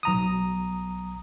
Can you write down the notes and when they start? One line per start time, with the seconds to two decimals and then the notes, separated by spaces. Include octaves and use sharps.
0.03 B1 A#5 D#6